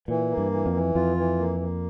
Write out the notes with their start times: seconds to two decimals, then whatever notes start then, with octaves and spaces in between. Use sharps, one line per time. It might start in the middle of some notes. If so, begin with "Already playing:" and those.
0.08 A#2 E3
0.30 A#3
0.38 G2
0.52 E3
0.66 F2
0.73 E3
0.95 F2 F4
1.17 E3
1.39 A#3
1.60 A#3